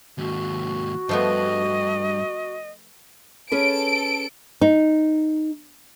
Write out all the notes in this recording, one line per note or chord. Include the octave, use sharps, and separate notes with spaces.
D#2 G#2 F#4
G2 F3 A3 B3 D#5
C#4 G#4 A4 B4 D7
D#4